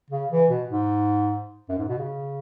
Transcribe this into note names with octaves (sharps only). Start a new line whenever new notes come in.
C#3
E3
B2
G#2
F#2
G#2
B2
C#3